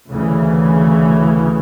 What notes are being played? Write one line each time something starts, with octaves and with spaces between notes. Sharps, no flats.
D2 C#3 E3